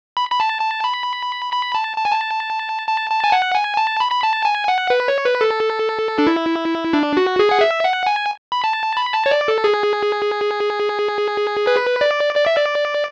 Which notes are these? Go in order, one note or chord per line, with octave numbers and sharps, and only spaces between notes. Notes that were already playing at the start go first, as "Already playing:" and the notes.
B5
B5
A5
A5
B5
B5
A5
A5
G#5
A5
A5
A5
G#5
F#5
G#5
A5
B5
B5
A5
G#5
F#5
B4
C#5
B4
A4
D4
E4
D4
F#4
G#4
F#5
E5
F#5
G#5
B5
A5
B5
A5
C#5
D5
A4
G#4
B4
D5
D5
E5
D5